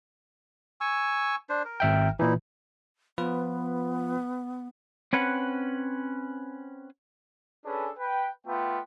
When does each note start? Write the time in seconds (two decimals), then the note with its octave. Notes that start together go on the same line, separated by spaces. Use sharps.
0.81 G#5 C#6 E6
1.49 D4 C5
1.65 A#4
1.80 G#1 E5 G5
2.19 A#2 E3 D#4 E4
3.18 F3 B3 F4 B4
5.13 C4 C#4 B4 F#5
7.65 C#4 D4 G#4 A4 B4
7.98 B4 G5
8.46 A3 B3 F4 G5